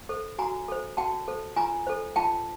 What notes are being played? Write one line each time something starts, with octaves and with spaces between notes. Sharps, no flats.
A4 C5
F#4 G#5 A#5
A4 C5
F#4 G5 A5
A4 C5
F4 G#5 A#5
A4 C5
F4 G5 A5